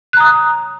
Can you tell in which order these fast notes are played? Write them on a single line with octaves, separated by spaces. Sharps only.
F#6 A#5 D#6